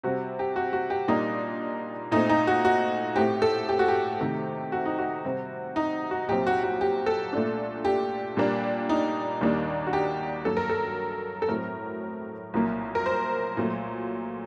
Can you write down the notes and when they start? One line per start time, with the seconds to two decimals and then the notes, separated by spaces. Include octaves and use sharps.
0.03 C3 G3 C4 F#4
0.39 G4
0.56 F#4
0.73 F#4
0.90 G4
1.08 A#2 G3 A#3 D4 D#4
2.12 A#2 A3 C4 D#4
2.29 D#4
2.47 F#4
2.65 F#4
3.16 A2 A3 C4 G4
3.42 A4
3.69 G4
3.79 F#4
3.88 G4
4.20 C3 D#3 A3 C4
4.72 F#4
4.86 D#4
4.98 F#4
5.25 C3 G3 C4
5.76 D#4
6.11 F#4
6.28 C2 A#2 F#3 C4 G4
6.47 F#4
6.63 F#4
6.81 G4
7.06 A4
7.33 A#2 A3 D4
7.85 G4
8.37 A#2 G3 A#3 D4
8.89 D#4
9.41 D#2 D#3 G3 A#3 D4
9.87 F#4
9.93 G4
10.45 G2 F#3 A#3 A4
10.57 A#4
10.69 A4
11.42 A4
11.49 A2 F#3 C4 A#4
12.54 C2 A#2 F#3 A#3
12.95 A#4
13.06 C5
13.57 A#2 F#3 A3